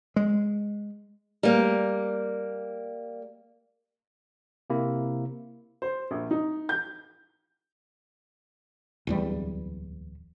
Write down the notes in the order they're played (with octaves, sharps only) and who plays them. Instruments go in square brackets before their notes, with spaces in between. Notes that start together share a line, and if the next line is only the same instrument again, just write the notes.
[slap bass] G#3
[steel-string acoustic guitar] G3 A#3
[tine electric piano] C3 A#3 E4
[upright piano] C5
A#1
D#4
G6
[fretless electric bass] D1 E2 G3